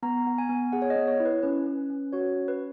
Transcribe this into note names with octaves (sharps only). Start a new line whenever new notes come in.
B3 A#5
B3
G#5
B3
G#4 F#5
C#5
D#5
B3
C#5
E4
B4
C#4 B4
C#4
C#4
F#4 C#5
C#4
B4